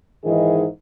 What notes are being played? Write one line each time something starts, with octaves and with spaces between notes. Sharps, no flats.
G#2 D#3 E3 D#4 E4 G#4